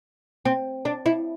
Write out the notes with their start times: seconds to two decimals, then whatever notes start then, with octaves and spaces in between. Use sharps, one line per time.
0.45 C4
0.85 D4
1.06 E4